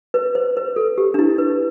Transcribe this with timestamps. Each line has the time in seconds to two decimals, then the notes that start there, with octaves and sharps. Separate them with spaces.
0.14 B4
0.35 C5
0.57 B4
0.76 A4
0.98 G4
1.14 D4
1.19 E4
1.38 B4